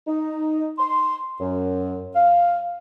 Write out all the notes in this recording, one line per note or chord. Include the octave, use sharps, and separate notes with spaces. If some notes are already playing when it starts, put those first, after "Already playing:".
D#4
C6
F#2
F5